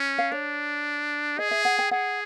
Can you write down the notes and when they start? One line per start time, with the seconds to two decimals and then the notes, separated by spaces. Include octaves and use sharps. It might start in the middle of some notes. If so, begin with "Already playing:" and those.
Already playing: C#4
0.18 F5
0.32 D4 C#5
1.39 G#4 D#5
1.51 E5
1.65 F#5
1.79 G5
1.91 G#4 F#5